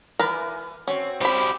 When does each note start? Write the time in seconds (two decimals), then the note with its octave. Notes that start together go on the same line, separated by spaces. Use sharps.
0.19 E3 A#4 B4
0.87 C4 C#4 F#4 C#5
1.21 C#3 G3 C4 E4 G4 B5